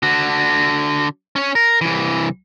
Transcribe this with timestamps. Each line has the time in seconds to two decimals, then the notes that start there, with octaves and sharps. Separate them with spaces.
0.03 D3 F#4
1.36 C#4 C#5
1.55 A#4
1.81 C2 E3